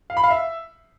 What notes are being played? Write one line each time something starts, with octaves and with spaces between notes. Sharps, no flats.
F5
B5
F5
E5